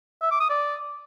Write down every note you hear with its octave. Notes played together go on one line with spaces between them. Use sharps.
E5
D6
D#6
D5